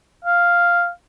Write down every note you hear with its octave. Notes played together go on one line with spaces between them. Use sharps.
F5